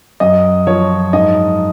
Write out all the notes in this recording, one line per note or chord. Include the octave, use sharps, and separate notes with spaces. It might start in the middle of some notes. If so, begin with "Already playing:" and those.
F#2 D#5
F3 C#5
G#2 D#5